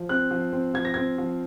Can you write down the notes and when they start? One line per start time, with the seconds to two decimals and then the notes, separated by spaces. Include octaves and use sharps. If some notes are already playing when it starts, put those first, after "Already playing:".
Already playing: F3
0.09 C4 F#6
0.31 F3
0.53 C4
0.74 F3 G#6
0.85 A#6
0.94 C4 G#6
1.18 F3